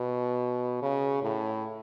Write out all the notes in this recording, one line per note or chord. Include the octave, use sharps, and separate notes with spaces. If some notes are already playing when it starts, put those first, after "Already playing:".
Already playing: B2
C#3
A2